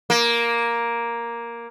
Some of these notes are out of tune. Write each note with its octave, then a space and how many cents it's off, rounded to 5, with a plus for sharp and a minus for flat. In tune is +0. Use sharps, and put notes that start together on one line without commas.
A#3 +5